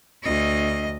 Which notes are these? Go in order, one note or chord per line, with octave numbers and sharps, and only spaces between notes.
D2 D#5